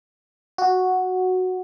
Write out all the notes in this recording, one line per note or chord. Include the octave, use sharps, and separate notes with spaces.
F#4